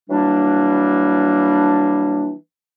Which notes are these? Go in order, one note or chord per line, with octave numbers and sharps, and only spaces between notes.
E3 F#3 G3 A#3 D4